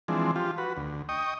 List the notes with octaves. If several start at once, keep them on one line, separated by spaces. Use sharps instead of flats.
E3 F3 G#3 C4 D4
F3 F4 G4
F#4 B4
D2
D#5 G5 C#6 D#6